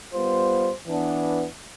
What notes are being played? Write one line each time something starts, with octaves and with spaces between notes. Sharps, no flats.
G3 B3 F4 C5
E3 B3 D4